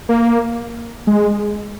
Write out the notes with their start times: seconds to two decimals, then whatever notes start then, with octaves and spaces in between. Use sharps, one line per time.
0.09 A#3
1.07 G#3